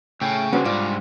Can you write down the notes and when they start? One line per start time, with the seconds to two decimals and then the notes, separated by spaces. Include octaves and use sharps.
0.21 A2 C#3 G5
0.53 G3 B3 C#4 D4 F#4 C5
0.65 G#2 F4 D5